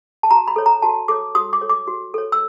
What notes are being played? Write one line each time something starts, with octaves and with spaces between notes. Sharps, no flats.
A5
F#4 A#5
B5
A4 C#5
A#5
F#4 A5
A4 C#5 D6
F#4 D#6
D6
A4 C#5
D6
F#4
A4 C#5
E6